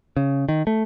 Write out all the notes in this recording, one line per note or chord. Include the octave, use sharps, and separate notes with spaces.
C#3
D#3
A3